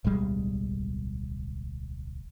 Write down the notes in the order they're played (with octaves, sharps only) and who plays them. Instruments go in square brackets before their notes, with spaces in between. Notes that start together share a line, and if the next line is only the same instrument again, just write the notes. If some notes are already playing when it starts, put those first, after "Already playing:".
[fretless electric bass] D1 B1 G3 G#3